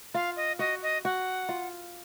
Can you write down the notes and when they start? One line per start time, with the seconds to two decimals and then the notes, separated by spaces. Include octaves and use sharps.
0.14 F4 F5
0.36 D#5
0.59 F#4 D#5
0.82 D#5
1.04 F#4 F#5
1.49 F4